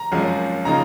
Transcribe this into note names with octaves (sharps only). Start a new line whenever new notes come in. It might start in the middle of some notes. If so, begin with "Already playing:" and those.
Already playing: A#5
G#1 F#2 F3 G#3 C#4
C#3 F3 A#3 D#4 A#5